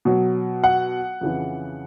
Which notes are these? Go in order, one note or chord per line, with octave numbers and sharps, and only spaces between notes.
B2 F#3
F#5
F2 C#3 E3